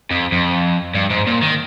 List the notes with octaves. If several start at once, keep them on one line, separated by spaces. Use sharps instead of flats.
F2
F2
G2
G#2
A#2
D#3